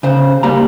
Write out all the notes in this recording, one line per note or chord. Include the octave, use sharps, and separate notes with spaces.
C#3 C5
G3 A#3 A#5